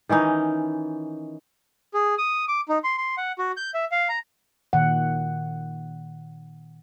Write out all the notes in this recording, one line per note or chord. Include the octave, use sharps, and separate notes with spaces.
D#3 E3 C#4 D#4
G#4
D#6
D6
D#4
C6
C6
F#5
F#4
G6
E5
F5
A#5
A#2 D#3 F#5